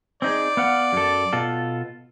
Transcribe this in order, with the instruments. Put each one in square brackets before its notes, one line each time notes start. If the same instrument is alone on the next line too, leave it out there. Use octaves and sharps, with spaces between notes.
[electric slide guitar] C4 D#4 G#4 [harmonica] D5
[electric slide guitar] B3 F5 F#5
F#2 A4
B2 F4 A4